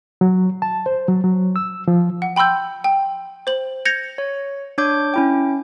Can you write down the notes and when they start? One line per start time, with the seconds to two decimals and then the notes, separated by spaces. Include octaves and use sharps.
0.21 F#3
0.62 A5
0.86 C5
1.08 F#3
1.24 F#3
1.56 E6
1.88 F3
2.22 F#5
2.36 G5 B5 C6 E6 G6
2.84 G5
3.47 C5 F#7
3.85 G6 G#6 A#6 C#7 F7
4.18 C#5
4.78 D4 C#5 D6 G6
5.14 C#4 E4 G5